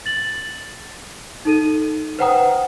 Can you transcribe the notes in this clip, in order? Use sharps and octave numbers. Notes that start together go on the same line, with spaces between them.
A6 F#7
D#4 A4 D#7
B4 C5 F#5 G5 A#5 D#6